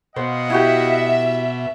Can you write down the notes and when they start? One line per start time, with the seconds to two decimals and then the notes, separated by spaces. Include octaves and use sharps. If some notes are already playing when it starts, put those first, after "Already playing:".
0.16 B2 C5 D#5 F5 F#5
0.50 E4 F#4 G4 E5